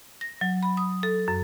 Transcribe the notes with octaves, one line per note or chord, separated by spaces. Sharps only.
A#6
F#3
B5
D#6
A4
F#2